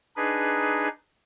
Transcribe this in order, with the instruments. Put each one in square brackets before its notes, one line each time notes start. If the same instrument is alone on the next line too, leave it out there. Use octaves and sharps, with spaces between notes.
[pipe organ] D4 D#4 G#4 B4